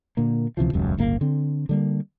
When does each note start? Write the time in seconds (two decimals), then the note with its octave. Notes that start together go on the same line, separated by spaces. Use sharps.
0.17 A#2 D3 A#3
0.57 C#2 C3 E3 F3
0.73 D#1 C#2 F#2
0.98 D1 G1 C#3 A#3
1.21 D3 C4
1.69 D3 G3 A#3